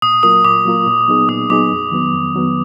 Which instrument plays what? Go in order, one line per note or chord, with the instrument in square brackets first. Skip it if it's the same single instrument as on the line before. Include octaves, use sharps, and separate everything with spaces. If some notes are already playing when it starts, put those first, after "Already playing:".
[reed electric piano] A#2 [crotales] D#6
[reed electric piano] F#3 A#3 F4 A#4 [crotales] D#6
[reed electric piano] A#2 [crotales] D6
[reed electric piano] F#3 A#3 F4 A#4
A#2
F#3 B3 D#4 G#4
[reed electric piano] A#2 [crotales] D#6
[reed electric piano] F#3 B3 D#4 G#4 [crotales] D6
[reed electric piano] F2
D#3 F#3 B3
F2
D#3 F#3 B3